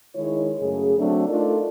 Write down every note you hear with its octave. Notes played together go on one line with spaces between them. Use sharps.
D#3 G#3 E4 C#5
F#2 C#3 A3 G#4
F#3 A3 C4 D4
A3 D4 D#4 F4 A4 A#4